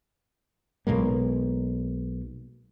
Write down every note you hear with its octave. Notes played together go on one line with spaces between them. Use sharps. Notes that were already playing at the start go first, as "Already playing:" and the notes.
B1 B2 G#3 A#3